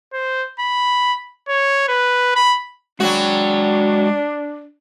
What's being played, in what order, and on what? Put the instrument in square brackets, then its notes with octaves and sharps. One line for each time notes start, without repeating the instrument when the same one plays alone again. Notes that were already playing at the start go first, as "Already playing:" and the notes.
[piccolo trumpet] C5
B5
C#5
B4
B5
[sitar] F#3 F#4 [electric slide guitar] G#3 G5 [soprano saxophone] D4